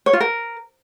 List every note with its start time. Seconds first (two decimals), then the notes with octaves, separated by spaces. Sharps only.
0.06 C#5
0.13 F4
0.20 A#4